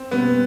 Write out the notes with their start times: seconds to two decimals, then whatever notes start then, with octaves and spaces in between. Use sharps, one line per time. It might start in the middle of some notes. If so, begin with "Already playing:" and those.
Already playing: C4
0.11 B2 G3 A#3 B3 C#4